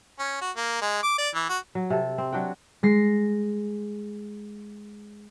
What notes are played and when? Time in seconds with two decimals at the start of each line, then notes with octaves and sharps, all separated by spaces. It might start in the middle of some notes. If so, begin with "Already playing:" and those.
0.19 C#4
0.41 F#4
0.56 A#3
0.81 G#3
1.03 D6
1.18 D5
1.35 E3
1.49 F#4
1.75 F#3
1.90 C3 A4
2.18 C4
2.33 F#3 D4 F#4 G5
2.83 G#3 A#6 C7